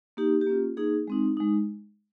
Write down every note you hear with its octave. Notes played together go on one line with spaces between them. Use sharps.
A#3 D#4 G4
G4
A#3 C#4 F4
A#3 D#4 G#4
G#3 C4 D#4
G#3 D#4